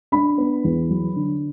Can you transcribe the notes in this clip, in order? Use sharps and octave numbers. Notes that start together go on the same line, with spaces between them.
D4 B5
B3
E2
F#3
D3